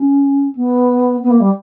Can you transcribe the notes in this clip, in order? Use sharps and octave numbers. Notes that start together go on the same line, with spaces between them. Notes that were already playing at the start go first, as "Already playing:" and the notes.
Already playing: C#4
B3
B3
A#3
G3